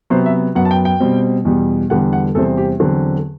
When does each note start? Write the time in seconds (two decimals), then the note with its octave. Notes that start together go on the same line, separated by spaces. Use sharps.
0.10 C3 F#3 B3 C5
0.26 E5
0.55 F#2 F#3 B3 F#5
0.65 A5
0.71 G5
0.85 G5
1.00 B2 G3 C4
1.45 E2 B2 G3
1.90 E2 D3 G3 B3 F#5
2.13 F#5
2.35 E2 C3 G3 C4 A4
2.57 G4
2.80 E2 D3 F#3 C4